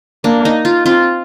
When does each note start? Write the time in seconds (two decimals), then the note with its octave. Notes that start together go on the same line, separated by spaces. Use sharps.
0.24 A#3 D4
0.45 D#4
0.65 F4
0.85 C4 F4